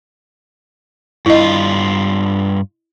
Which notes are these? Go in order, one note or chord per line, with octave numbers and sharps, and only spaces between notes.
G2 E4 F4 D#5